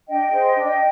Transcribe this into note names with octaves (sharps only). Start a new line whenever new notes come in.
D4 D#5 G5
G#4 C5
D4